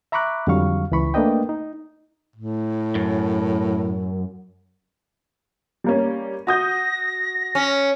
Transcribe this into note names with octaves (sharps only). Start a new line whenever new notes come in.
E5 A#5 B5 C#6 D6 F#6
F2 D3 F#3 G3 F5 C#6
C#2 E3 B5 C#6
A3 A#3 D4 B4 D#5 G5
D#4
A2
F#2
G3 A#3 C#4
F#4 D#6 G6 A#6
C#4